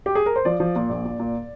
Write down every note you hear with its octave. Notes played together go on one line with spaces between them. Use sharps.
G4
G#4
A#4
C5
F3 D5
F3
A#2
A#1
A#2
A#2